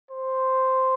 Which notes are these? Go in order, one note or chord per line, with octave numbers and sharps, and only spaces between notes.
C5